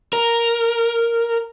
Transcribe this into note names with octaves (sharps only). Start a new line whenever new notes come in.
A#4